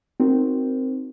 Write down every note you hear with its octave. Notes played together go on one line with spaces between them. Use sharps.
C4 D#4 F#4 A#4 C5